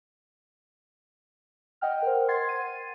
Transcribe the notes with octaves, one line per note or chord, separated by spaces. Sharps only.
D#5 F#5 G5 F6
A#4 C5
F#5 C6 G#6 A6 C7
D#7